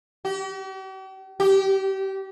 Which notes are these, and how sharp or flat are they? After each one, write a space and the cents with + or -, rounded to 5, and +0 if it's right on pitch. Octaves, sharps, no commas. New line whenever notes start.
G4 -45
G4 -25